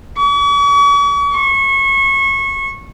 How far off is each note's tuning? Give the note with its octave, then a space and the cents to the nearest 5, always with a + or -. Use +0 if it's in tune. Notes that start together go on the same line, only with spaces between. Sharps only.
C#6 +45
C#6 -25